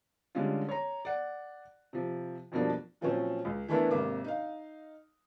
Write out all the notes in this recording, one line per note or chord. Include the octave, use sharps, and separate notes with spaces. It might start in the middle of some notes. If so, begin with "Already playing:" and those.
D3 G3 G#3 C#4 F4
C#5 A#5
D5 F#5
C3 F3
F2 B2 F3 G3 A#3 D4
A#2 F3 F#3 C4 C#4
C#2
E3 A3 B3 D4 E4 A#4
G#1 C3 A#3 D6
D#4 F5